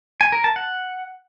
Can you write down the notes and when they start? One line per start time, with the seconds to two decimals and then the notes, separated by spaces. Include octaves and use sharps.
0.21 G#5
0.32 A#4
0.44 A5
0.56 F#5